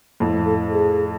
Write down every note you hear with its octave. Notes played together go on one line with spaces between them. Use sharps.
F2 A2
A4
G#4